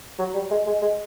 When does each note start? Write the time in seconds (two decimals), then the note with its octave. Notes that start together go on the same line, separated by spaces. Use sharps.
0.19 F#3
0.35 G3
0.51 G#3
0.67 G#3
0.82 G#3